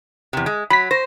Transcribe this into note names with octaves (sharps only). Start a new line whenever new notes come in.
E2 C3
G#3
F#3 B5 B6
C5 A#6